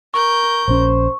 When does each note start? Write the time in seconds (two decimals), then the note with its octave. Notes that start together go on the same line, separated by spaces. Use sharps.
0.14 A#4 C#6 G6
0.68 A#1 C#4 C5